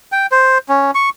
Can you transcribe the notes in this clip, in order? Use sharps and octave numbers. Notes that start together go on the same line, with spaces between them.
G5
C5
C#4
C#6